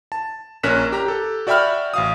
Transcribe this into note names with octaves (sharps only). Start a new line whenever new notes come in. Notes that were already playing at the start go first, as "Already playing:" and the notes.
A5
A#1 C#4 A#4 F#6 B6 E7
G4 A#5
G4 A4
F#4 D5 E5 G5 B5 F6
A1 F5 D#6